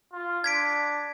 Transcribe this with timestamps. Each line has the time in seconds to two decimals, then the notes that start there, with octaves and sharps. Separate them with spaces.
0.13 F4
0.44 D4 G#6 B6 D7